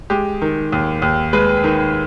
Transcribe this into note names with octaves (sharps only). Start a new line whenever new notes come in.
G#3 G4
D#3
D#2
D#2
G#3 B4
D#3